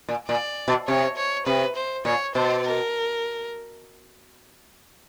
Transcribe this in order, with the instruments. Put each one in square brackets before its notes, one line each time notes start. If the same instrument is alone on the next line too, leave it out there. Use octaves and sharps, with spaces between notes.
[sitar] A#2
[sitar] A#2 [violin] D5
[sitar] B2
[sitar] C3 [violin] C#5
[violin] C#5
[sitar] C3 [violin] B4
[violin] C5
[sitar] A#2 [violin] C#5
[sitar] B2 [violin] C5
[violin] A#4